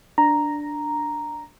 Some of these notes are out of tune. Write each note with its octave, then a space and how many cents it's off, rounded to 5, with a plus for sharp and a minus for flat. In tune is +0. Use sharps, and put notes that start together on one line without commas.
D4 +0 A#5 +0